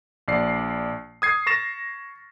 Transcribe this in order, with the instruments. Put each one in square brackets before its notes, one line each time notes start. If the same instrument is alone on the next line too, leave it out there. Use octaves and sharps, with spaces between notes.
[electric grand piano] A#1 D5 C7
D#6 G#6 C7
C#6 A6 A#6 E7